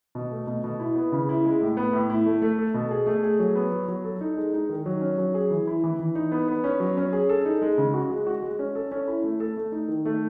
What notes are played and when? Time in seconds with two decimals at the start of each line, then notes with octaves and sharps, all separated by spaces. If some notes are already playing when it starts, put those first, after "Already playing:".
0.15 B2
0.31 A3
0.47 B2
0.64 B2
0.80 E4
0.96 B3
1.12 C#3
1.29 E4
1.45 G#3
1.61 A2
1.77 B3
1.93 A2
2.10 E4
2.26 A3
2.42 A3
2.59 A4
2.74 B2
2.91 G#4
3.07 A3
3.23 G#4
3.39 F#3
3.55 B3
3.72 F#3
3.88 F#3
4.05 A4
4.21 D#4
4.37 G#3
4.53 D#4
4.69 D#3
4.86 F#3
5.01 C#4
5.18 F#3
5.34 G#4
5.51 E3
5.67 E4
5.84 E3
5.99 E3
6.15 D#4
6.32 B3
6.48 B3
6.64 C#4
6.80 F#3
6.97 C#4
7.13 G#4
7.29 A4
7.45 D#4
7.62 G#3
7.78 C#3
7.94 F#4
8.10 G#3
8.27 F#4
8.42 G#3
8.59 C#4
8.75 A4
8.92 C#4
9.08 E4
9.24 A3
9.40 A4
9.57 A3
9.72 D#4
9.88 D#3
10.05 A3